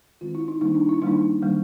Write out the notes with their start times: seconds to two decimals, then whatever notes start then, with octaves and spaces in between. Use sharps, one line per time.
0.21 D#3 G#3 C4 F4
0.35 E4
0.48 D#4
0.61 D#3 G3 A#3 D4 D#4
0.75 D4
0.89 E4
1.02 D#3 G3 A#3 D4 D#4
1.42 D#3 G3 A#3 D4